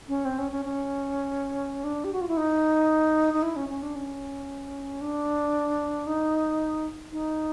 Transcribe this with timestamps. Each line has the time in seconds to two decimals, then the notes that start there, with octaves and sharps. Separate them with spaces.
0.08 C#4
0.25 C4
0.38 C#4
0.52 C#4
0.65 C#4
1.84 D4
2.04 G4
2.13 F#4
2.21 F4
2.28 E4
2.37 D#4
3.34 D#4
3.43 E4
3.56 C#4
3.69 C#4
3.83 D4
3.95 C#4
5.01 D4
6.07 D#4
7.12 D#4